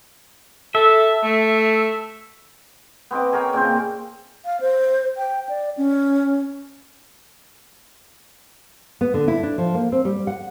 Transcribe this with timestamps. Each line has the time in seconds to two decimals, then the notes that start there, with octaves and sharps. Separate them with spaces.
0.75 A4 E5
1.23 A3
3.11 B3 C4 D#5 D6
3.33 G#4 A#4 C#5 G5
3.53 A#2 C#3 C4 C5
4.45 F5
4.61 C5
5.17 G5
5.49 D5
5.77 C#4
9.01 B3
9.14 D3
9.28 E4
9.43 D4
9.58 F3
9.74 A#3
9.92 C4
10.05 G3
10.27 F#5